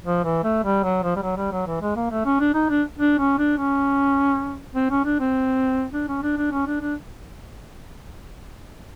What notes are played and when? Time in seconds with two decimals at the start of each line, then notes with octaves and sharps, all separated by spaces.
0.05 F3
0.24 E3
0.44 A3
0.64 G3
0.83 F#3
1.03 F3
1.16 G3
1.23 F#3
1.37 G3
1.52 F#3
1.67 E3
1.82 G#3
1.96 A#3
2.11 A3
2.26 C#4
2.40 D4
2.54 D#4
2.70 D4
2.99 D4
3.18 C#4
3.39 D4
3.58 C#4
4.75 C4
4.91 C#4
5.05 D4
5.20 C4
5.93 D4
6.08 C#4
6.23 D4
6.37 D4
6.52 C#4
6.67 D4
6.81 D4